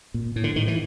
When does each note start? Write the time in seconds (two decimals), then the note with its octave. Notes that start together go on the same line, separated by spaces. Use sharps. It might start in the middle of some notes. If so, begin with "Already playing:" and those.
0.14 A#2
0.36 A2
0.44 D3
0.56 A2 D#3
0.68 E3